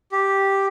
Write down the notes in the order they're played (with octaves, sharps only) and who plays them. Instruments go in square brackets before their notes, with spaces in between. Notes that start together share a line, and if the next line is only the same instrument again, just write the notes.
[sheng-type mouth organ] G4